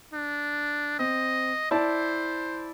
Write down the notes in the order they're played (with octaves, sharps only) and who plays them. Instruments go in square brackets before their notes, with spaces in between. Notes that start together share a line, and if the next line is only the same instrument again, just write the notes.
[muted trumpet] D4
[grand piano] C4 [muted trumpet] D#5
[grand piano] E4 D5 A5 [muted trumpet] C5